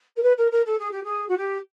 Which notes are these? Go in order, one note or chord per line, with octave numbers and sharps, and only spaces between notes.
A#4
B4
A#4
A#4
A4
G#4
G4
G#4
F#4
G4